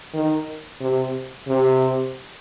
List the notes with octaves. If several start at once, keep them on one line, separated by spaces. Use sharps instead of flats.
D#3
C3
C3